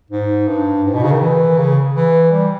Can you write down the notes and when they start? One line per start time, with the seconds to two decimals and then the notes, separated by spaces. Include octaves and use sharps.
0.11 G#2
0.48 G2
0.84 G#2
0.93 B2
1.03 C#3
1.12 D#3
1.21 E3
1.58 C#3
1.94 E3
2.31 G3